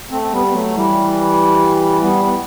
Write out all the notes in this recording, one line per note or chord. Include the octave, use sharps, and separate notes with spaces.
A3 C4
C4
G3 B3
B3
F#3 A3
E3 G3
G3 B3
B3